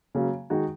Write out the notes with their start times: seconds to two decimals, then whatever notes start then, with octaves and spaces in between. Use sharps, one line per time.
0.15 C#3 F#3 A#3
0.50 D#3 G#3 D#4 F#4